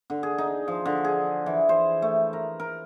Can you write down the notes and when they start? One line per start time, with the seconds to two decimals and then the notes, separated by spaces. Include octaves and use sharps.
0.10 D3
0.23 G#4
0.38 D#4
0.68 F3
0.85 D3
1.05 G#4
1.46 E3
1.69 C5
2.02 A3
2.33 A#4
2.60 A#4